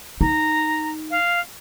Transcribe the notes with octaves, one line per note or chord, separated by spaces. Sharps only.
D#4 A#5
F5